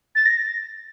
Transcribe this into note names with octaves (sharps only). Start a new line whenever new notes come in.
A6
A#6